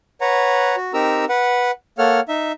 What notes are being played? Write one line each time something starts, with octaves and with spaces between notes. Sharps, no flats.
B4 C#5 F#5 A#5
F#4
C4 D#4 G4 A#4 A#5 E6
B4 F#5
A#3 A4 C#5 F#5 F6
D#4 E5